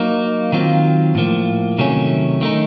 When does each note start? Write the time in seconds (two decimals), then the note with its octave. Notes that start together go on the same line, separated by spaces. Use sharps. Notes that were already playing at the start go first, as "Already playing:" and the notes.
Already playing: F#3 A#3 D#4
0.52 D#3 F#3 C4 F4
1.15 A2 F3 A#3
1.78 C3 D#3 F#3 A3 C#4
2.41 D#3 A3 D#4